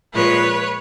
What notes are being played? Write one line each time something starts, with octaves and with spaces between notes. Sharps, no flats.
A#2 F3 G#3 B4 C#5